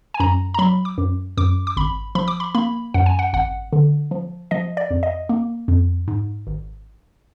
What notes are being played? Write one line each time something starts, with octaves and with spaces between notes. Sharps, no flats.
G#5
F#2 A#5
A#5
F#3 B5
D6
F#2
F#2 D6
D6
G#1 B5
F3 B5
D6
B5
A#3 B5
F#2 F#5
G#5
F#5
G#1 F#5
D3
F3
F3 D#5
D5
F2
D#5
A#3
F2
G#2
G#1